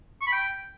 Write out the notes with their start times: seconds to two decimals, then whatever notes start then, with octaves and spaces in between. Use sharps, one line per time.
0.21 C#6
0.27 B5
0.33 G5